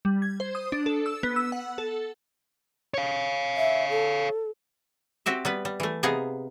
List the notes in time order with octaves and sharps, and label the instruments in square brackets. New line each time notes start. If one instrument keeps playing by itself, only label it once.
[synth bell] G3
G#6
C5
D#6
D4
A4
E6
B3
E6
F#5
A4
[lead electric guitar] C#5 F5
[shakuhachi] E5
A4
[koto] C4 F#4 G4 E5
G3 B3 B4
G3
E3 A3
C3 B3 D#4 G#4 F5